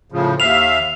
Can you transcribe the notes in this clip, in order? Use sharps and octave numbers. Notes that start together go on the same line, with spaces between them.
A2 C#3 F3
D#2 E5 F5 F7